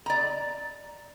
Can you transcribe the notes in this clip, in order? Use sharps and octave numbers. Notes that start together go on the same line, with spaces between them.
D5 A#5